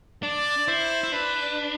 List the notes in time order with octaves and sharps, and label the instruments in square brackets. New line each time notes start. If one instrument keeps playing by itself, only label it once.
[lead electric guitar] D4 [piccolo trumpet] D5
[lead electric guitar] E4 [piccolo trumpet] C5
[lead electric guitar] E4
[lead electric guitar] D4 [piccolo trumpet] B4